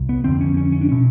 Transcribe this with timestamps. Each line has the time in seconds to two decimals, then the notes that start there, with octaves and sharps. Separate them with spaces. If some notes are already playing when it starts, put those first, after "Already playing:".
Already playing: C2
0.09 B3
0.24 F2 D3 C4
0.41 C#4
0.57 C#4
0.72 C#4
0.81 D4
0.89 B2 C#4